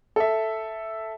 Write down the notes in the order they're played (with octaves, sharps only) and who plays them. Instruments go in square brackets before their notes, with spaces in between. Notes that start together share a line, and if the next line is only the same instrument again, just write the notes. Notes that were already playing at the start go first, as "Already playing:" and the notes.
[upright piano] A4 E5